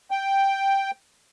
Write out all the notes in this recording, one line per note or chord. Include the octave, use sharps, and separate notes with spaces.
G5